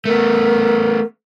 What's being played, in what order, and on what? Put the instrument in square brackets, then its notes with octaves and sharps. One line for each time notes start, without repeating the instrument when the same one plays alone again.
[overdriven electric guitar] A3 B3 [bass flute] A#4